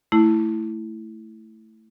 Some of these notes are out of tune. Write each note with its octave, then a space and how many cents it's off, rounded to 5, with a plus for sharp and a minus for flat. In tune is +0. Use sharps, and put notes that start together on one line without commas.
A3 +5 E4 +0